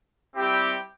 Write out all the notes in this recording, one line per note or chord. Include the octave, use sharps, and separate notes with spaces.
G3 C4 E4 G4